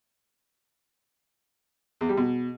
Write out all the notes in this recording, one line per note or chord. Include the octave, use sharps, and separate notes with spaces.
E2
G3
B2